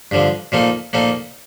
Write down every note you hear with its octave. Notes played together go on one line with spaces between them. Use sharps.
G2 D3 F3
A#2 F3 A#3 D#4 A4
A#2 F3 A#3 D#4 A4